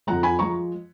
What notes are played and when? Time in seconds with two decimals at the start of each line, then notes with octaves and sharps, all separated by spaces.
0.07 F2 F3 G#3 F#5 A#5
0.23 G#5 B5
0.39 F3 G#3 A#5 C#6